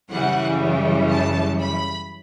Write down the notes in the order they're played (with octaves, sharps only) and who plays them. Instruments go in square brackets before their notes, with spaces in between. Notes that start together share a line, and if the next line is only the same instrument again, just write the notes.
[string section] F#2 C#3 E3 G3 F#5
A5
B5